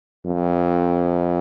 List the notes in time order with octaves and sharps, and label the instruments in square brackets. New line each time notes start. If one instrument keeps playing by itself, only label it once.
[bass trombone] F2